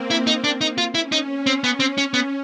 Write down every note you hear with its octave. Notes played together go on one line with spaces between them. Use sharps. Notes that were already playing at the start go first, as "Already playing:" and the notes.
Already playing: A#3 C4
E4
D#4
D4
D#4
F4
C#4 E4
D#4
C4
B3
C4
C#4
B3